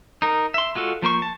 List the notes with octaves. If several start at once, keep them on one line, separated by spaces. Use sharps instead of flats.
D#4 A#4
E5 C6
G#3 F4 F#4 A4
F3 A#3 C5 C#6
A5